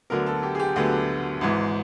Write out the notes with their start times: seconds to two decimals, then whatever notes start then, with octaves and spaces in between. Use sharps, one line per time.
0.10 D2 D3 F#3 B3 A#4
0.26 A4
0.43 G4
0.55 G#4
0.59 G4
0.76 D2 D3 F#3 B3 G#4
1.41 G#1 G#2 E3